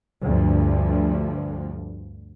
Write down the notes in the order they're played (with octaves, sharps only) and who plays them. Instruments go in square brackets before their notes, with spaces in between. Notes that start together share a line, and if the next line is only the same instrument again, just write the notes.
[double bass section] D2 G2 F3